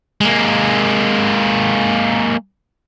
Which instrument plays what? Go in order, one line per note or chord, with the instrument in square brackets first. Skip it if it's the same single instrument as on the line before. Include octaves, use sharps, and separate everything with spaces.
[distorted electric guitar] G#3 A#3